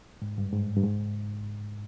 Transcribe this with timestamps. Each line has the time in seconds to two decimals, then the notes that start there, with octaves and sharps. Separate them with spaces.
0.22 G#2
0.38 G2
0.53 G#2
0.76 G2
0.84 G#2